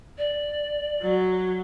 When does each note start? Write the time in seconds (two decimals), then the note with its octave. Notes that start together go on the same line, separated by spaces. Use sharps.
0.18 D5
1.02 F#3